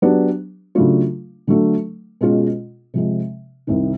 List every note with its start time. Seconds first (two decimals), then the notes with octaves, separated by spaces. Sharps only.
0.02 F#3 B3 D4 G4
0.75 C#3 F#3 A3 D4 F4
1.47 D3 F#3 A3 D4
2.21 B2 G#3 C#4 F4 G#4
2.94 C3 F3 G#3
3.67 C2 C3 D#3